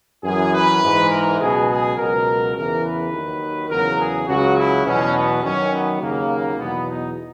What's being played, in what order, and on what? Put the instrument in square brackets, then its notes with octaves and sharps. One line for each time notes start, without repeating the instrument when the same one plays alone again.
[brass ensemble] F#2 E3 G#4
B4
G#2 E3
A#4
C#2 B2 F#3 G#4
G#4
C#2 B2 F#3 A#4
E2 C#3 E3 A#4
B4
D#2 D#3 F#3
E2 C#3 F#3 A#4
G#4
C#2 C#3 F#3 F#4
E4
E2 B2 F#3 C#4
B3
F#2 D#3 F#3 C#4
B3
D#2 C#3 F#3 A#3
E2 B2 F#3 B3
D#4